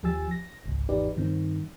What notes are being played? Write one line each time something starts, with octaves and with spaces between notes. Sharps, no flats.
D#2 F3 G4 G#5 E6 A6
A#6
G#1 C#2
G#1 E2 D#4 G4 B4 D5
G2 D#3 C4